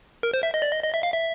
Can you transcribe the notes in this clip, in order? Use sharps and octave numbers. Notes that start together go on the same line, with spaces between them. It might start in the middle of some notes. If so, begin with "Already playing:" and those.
A#4
C5
E5
D#5
D5
D#5
D#5
E5
F5
E5